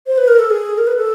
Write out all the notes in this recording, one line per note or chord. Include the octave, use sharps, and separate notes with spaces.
C5
B4
A#4
A4
G#4
A#4
B4
A4